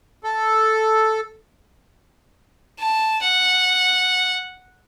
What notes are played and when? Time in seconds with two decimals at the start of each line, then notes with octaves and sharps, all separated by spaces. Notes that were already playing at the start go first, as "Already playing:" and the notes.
0.24 A4
2.79 A5
3.22 F#5